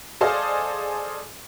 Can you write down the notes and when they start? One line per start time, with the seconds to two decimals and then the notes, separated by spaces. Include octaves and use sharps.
0.21 G#4 A4 C5 D5 D#5 F5